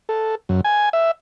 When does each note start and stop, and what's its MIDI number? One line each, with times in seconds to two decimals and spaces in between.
0.09 0.35 69
0.49 0.61 42
0.65 0.89 80
0.93 1.11 76